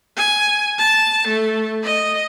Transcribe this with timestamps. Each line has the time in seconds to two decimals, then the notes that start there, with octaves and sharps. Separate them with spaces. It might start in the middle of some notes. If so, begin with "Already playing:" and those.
0.17 G#5
0.78 A5
1.28 A3
1.84 D#5